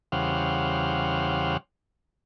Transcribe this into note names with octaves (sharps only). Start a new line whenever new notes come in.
E2 C#3 G3 C5 F5 F#5